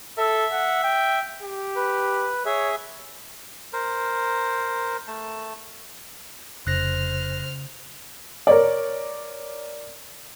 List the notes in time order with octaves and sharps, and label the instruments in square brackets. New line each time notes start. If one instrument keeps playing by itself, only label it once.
[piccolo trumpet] A4 [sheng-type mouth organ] E5
[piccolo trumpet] F#5
G5
G4
[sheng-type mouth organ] B4
[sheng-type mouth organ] G#4 E5 [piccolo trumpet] C#5
[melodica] A#4 C5
A3 A5
[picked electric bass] F1 [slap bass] C#3 [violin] C5 F6 [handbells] F#6 A#6
[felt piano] A#4 C#5 D5